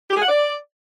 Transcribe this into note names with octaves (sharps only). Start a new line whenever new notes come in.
G4
G#4
F#5
D5